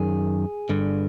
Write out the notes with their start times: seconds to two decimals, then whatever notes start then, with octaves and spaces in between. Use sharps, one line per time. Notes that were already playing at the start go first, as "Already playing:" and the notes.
Already playing: F#2 D#3 G#4
0.70 G2 D3